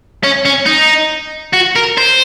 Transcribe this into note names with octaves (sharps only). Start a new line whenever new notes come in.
C#4
C#4
D#4
F#4
A#4
C5